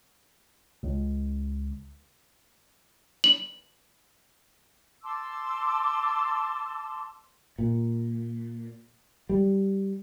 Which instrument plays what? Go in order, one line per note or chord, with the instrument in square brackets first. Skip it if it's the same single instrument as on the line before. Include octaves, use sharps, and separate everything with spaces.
[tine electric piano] C#2
[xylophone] F#7
[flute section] A5 C6 D6 E6
[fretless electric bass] A#2
G3